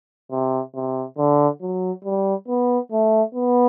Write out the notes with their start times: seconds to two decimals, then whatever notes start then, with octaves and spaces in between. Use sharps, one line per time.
0.31 C3
0.75 C3
1.18 D3
1.61 F#3
2.04 G3
2.48 B3
2.92 A3
3.35 B3